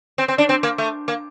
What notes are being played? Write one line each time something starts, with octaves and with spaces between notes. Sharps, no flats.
C4
C4
D4
C4
A#3
A3
A#3